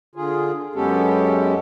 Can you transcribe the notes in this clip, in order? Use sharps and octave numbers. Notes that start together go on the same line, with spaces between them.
D3 F4 G#4
F#2 G#3 B3 C#4 G4 A4